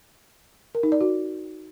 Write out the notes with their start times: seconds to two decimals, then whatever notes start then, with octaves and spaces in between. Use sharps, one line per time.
0.75 A#4
0.83 D#4
0.92 D5
1.01 F#4